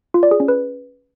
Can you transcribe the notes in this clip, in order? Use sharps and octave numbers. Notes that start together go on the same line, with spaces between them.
F4
D5
G#4
C#4
B4